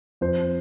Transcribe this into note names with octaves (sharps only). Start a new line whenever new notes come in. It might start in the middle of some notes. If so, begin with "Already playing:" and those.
F2 C5